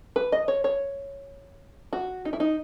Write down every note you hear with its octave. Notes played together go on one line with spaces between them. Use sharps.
B4
D#5
C#5
C#5
F#4
D#4
E4
D#4